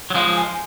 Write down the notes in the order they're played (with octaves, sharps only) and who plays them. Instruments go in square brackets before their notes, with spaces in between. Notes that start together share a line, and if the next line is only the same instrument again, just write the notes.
[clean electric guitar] F#3
[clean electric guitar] F3 G#3 [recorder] F5
[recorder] G#5